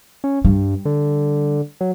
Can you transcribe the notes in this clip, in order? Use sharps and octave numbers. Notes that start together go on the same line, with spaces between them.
C#4
G2 G3
D3
F#3